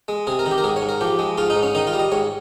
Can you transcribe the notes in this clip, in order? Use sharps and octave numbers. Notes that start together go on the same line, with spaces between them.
G#3
C3 G#4
A#4
D#3
G4
A#4
G#2 G#4
C#5
G#2
A#4
F3 G4
G#3
G#2 F4
D#4
G#2
C#4
D#3 D#4
F4
G3
D#5
G#2 C#5